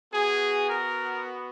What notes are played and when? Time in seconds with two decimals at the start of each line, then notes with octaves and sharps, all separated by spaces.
0.13 B3 F#4 G#4
0.70 A#4